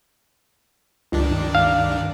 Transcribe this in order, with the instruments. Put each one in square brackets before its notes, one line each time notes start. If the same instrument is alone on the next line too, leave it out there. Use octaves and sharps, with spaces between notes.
[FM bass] C#2 [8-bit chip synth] G2 D#3 D4
[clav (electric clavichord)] F5